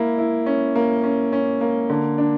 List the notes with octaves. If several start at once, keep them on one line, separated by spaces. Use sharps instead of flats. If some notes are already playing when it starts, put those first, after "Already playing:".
Already playing: A#3 E4
E4
C#4
A#3
C#4
C#4
A#3
D3
D4